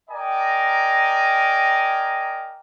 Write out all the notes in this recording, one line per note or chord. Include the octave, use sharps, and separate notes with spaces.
A#4 D5 D#5 G5 G#5 A#5